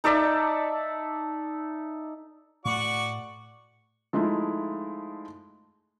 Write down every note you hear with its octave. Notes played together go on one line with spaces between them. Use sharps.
D#4 A4 D5 E5
A2 A3 F#4 D5 C#6
F3 G#3 A3 D#4 E4